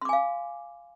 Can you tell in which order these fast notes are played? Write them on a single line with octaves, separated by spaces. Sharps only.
C6 D6 G#5 F5